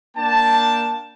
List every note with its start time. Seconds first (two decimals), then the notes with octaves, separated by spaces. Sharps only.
0.17 A#3 D4 G5 A5